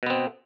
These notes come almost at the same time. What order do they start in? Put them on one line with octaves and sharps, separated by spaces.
B2 B3 C4